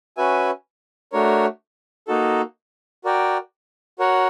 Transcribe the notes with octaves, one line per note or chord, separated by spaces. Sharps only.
C#4 F#4 B4 E5 G#5
A3 D4 F#4 A#4 C#5
A#3 D#4 F#4 A4
F#4 A#4 D5 G5
F#4 A#4 C#5 F#5